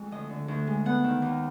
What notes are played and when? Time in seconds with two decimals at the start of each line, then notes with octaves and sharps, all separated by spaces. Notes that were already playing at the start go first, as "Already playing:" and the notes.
Already playing: F2 G#3
0.11 D2 D#5
0.30 D3
0.48 D2
0.67 G#3
0.85 B3 F#5
1.04 D#3
1.22 D#2